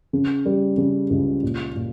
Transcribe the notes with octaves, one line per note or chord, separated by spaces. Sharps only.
C#3
G3
C#3
C#2
A#2
A#2